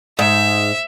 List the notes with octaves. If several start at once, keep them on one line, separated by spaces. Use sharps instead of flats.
G#2 E5